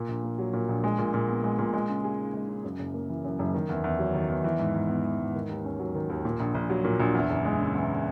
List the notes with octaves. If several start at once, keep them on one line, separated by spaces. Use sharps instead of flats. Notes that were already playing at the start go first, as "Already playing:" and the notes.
Already playing: A#2
A#1
A#3
F#3
A#2
A#1
G#3
A#2
A#2
B3
G#3
A#2
G#3
C#3
G#4
D#4
G#3
C#3
F#2
F#1
A#3
E3
F#2
F#1
D#3
E2
E2
F#3
D#3
E2
E3
G#2
G#2
B3
E3
G#2
D#3
D#2
C#4
F#3
D#3
D#2
A#2
A#1
A#1
F#3
A#2
A#1
E2
F#1
G#3
C#3
E2